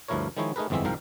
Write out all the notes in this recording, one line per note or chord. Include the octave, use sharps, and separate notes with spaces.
D2 G2 F3 E4 A#4 C#5
D#3 F3 G#3 D#4 E4 C#5
A3 D#4 G#4 A#4 B4
G1 F2 E3 G#3 C4 E5
C2 G#2 F3 A#4 F5 G5